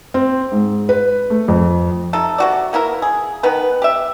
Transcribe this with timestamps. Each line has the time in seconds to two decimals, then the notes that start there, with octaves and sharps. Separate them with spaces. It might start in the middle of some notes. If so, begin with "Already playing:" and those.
0.14 C4
0.52 G#2
0.89 B4
1.30 A3
1.48 F2
2.13 C3 D#4 A4
2.38 C3 F#4 D5
2.73 A#3 B3 E4 A#4
3.02 G#4
3.43 D#3 B3 B4
3.82 G4 E5